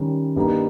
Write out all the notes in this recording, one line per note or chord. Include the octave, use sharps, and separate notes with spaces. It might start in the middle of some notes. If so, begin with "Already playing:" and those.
Already playing: D#3 G3 C#4
G2 G3 A#3 D#4